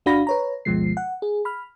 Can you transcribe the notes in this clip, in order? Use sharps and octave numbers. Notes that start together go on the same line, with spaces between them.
G1 D4 F#4 F5 B5 A#6
B4 C#5 A#5
G1 D2 B2 F3 G#3 C7
F#5
G#4
B5 F6